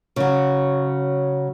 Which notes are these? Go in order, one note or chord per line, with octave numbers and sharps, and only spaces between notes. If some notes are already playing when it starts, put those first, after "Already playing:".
C#3 F#3